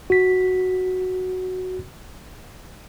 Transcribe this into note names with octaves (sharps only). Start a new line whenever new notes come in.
F#4 B6